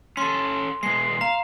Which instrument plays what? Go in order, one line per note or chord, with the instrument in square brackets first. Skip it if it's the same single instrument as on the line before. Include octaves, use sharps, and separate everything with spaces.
[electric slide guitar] C#4 A4 [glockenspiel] C6
[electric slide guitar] B2 G#3 [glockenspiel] C7
[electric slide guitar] F5 [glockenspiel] A#5